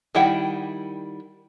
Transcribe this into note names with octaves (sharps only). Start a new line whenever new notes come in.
D#3 G3 E4 F#5 G5